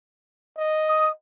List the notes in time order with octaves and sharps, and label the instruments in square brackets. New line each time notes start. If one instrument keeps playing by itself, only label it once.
[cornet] D#5
[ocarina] D#6